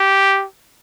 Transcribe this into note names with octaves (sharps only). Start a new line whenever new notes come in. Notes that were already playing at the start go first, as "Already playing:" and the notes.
Already playing: G4